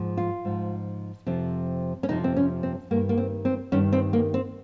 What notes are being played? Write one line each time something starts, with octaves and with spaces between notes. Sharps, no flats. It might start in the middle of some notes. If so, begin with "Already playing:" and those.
Already playing: G#2 F3
F4
G#2 F3
F2 C3 F3
C#4
F2 C3 F3 D#4
C4
C#4
C4
G2 D#3 A#3
A#3
C4
C4
G2 D#3 C#4
C4
A#3
C4